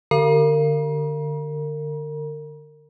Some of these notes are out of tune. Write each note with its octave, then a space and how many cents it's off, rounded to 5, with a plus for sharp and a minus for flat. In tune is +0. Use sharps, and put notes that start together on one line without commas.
D3 +15 A#4 -30 A#5 +40